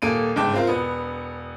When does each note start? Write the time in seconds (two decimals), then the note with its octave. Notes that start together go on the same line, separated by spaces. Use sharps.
0.02 D#1 A#3 A4 D7 D#7
0.36 G1 G#2 C#3 G5 A5 D6
0.54 C4 F4 A#4
0.67 E1 B3